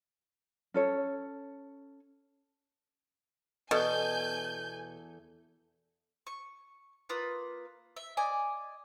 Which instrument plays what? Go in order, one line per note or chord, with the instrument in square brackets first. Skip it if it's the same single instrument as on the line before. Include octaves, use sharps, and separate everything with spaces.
[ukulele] C#4 A4 C#5
[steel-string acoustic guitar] E2 A4 [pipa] B2 [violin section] G#5 G6
[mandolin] C#6
A#3 F4 B4 D#6
E5
D5 D#5 G#5